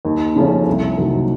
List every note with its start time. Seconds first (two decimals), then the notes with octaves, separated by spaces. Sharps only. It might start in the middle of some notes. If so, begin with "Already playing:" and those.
0.05 D#2
0.36 C#3 F3 A3 C#4
0.67 C2
0.98 C3 D#3 F#3 A#3